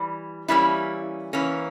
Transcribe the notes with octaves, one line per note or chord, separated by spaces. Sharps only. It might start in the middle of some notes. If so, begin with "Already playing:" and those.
Already playing: E3 G3
E3 G3 A#3 C#4 E4
E3 A#3 C#4